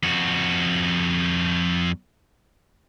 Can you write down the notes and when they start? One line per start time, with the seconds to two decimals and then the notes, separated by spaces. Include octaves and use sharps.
0.03 F2 F#4